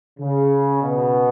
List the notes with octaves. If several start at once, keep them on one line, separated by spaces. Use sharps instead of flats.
C#3
B2